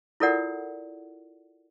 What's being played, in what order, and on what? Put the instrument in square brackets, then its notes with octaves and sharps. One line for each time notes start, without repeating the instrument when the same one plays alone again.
[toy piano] E4 F4 A4 A#4 D5 F#5